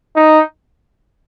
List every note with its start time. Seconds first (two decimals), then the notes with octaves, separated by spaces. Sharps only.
0.16 D#4